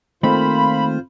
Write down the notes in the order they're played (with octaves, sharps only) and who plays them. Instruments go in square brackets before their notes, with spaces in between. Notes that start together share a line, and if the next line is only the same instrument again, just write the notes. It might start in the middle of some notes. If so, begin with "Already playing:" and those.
[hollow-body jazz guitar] D#3 A3 A#3 [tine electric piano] C4 [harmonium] F4 C5 [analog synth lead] B5